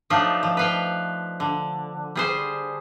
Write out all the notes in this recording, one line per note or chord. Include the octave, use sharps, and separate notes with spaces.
F3 F#3 A3 D4 D#4 F4
F3
B4 F5 G5
D3
G3 G#4 C5